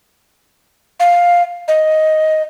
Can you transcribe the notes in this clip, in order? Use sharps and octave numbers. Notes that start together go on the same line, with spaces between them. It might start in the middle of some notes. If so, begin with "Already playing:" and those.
F5
D#5